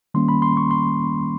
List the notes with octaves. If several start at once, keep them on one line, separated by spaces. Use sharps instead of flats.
D#3 G3 A#3 C#4 C6
B5
C6
C#6
C6